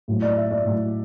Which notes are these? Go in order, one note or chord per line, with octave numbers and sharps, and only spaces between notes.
A2 F#3
D5
E5
D5
A2 F#3